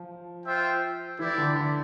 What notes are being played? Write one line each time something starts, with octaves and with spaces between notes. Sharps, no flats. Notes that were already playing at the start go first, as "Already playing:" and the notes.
Already playing: F3
F4 C5 E5 G5
E3 E4 G4 D5
D3
D3